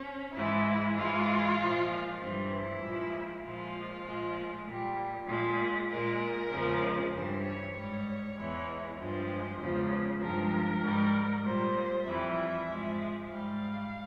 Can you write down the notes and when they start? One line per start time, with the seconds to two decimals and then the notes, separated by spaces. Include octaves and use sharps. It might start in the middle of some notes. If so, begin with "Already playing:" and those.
Already playing: C#4
0.34 G#2 E3 G#3 E4
0.96 G#2 E3 G#3 F4
1.58 A#2 F3 G#3
2.20 G2 E3 G3 C4
2.51 E4
2.81 A#2 F3 G#3
3.42 A#2 F3 G#3 F4
4.04 A#2 F3 G#3
4.66 A#2 G3
5.27 A#2 G#3
5.89 A#2 G#3 A#4
6.51 E2 C#3 F3 G#3
7.13 G2 E3 G3 C5
7.44 C#5
7.74 G#2 G3 C#5
8.36 E2 E3 G#3
8.98 G2 F3 G#3 C5
9.59 E2 C#3 F3 G#3
10.20 G2 F3 G#3 A#4
10.82 G#2 G3
11.44 A#2 G3 C5
12.05 F2 E3 G3 E5
12.68 G#2 F3 G#3
13.29 G#2 G3 F5